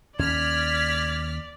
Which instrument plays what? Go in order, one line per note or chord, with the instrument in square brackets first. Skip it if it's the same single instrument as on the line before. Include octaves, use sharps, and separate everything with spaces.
[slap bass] D#2 C#4 [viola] D5 [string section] F6 B6 [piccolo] G#6